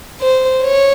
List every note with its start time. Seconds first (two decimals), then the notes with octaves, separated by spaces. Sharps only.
0.21 C5
0.63 C#5